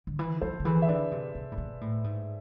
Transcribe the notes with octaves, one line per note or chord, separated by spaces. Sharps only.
D3
E3
F3 A4 C5
D3
E3 G#4 B4
E5
D3 B4 D5
C3
C3
A2
B2
A2
G#2